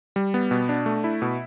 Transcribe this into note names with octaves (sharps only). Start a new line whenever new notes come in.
G3
B3
B2
D4
A3
E4
B2